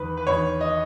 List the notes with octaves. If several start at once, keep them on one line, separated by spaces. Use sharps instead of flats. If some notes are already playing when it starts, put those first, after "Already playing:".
Already playing: E2 D#3 B4
B4
E2 D#3 C#5
D#5